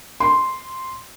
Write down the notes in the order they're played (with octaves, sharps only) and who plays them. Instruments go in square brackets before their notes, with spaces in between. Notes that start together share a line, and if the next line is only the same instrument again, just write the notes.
[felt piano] C6